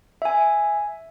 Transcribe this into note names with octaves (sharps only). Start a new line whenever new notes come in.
E5 G#5